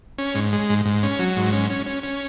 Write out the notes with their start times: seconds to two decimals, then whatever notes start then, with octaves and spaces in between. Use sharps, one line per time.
0.18 C#4
0.35 G#2
0.53 G#3
0.69 G#2
0.85 G#2
1.03 C#4
1.19 F#3
1.37 G#2
1.53 C#4
1.70 C#4
1.86 C#4
2.03 C#4